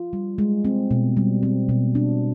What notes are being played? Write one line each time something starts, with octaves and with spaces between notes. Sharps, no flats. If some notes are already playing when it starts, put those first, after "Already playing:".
Already playing: F4
G3
G#3
C4
B2
G3
C4
B2
D4